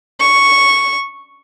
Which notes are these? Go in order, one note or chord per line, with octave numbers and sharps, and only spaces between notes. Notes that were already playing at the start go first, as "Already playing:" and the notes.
C#6